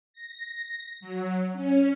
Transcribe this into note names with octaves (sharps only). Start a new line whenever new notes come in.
A#6
F#3
C#4